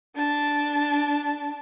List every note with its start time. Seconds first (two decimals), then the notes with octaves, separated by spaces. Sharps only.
0.16 D4 A5